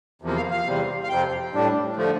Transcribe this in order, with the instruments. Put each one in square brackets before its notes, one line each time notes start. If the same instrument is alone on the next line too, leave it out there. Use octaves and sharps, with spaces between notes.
[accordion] E2 C3 F3 A#3
F5
F5
E2 C3 G3
F5
F2 C3 F3 G5
A2 G3 D4
D3 F3 A3